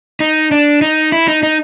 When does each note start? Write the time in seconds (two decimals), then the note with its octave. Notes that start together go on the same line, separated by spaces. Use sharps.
0.20 D#4
0.51 D4
0.82 D#4
1.12 E4
1.28 D#4
1.43 D#4